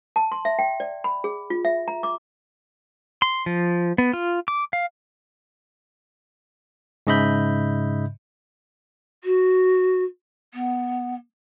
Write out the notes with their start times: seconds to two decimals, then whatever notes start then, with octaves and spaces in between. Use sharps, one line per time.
0.16 A5
0.32 C6
0.45 E5
0.59 G5
0.80 D5
1.04 B5
1.24 G#4
1.50 F4
1.65 E5
1.88 A#5
2.03 D6
3.22 C6
3.46 F3
3.98 B3
4.13 F4
4.48 D6
4.73 F5
7.07 G#2 C#3 D#5 E5 B5 G6
9.24 F#4
10.54 B3